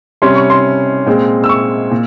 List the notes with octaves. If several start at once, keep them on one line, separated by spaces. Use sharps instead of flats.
C3 G3 C#4 C6
C#6
C6
A#2 G#3 C4
E6
C#6
A#2